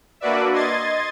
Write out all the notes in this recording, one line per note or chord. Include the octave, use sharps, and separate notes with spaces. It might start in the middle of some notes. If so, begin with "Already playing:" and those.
A#3 D4 F#4 B4 D5 E5
D#5 C6 G#6 A6